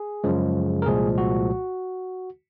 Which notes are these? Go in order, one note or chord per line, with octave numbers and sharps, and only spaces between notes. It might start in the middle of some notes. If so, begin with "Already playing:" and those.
Already playing: G#4
F#2 C#3 F3 G#3
A#4
C2 A#2 F3 G#3 G#4
F#4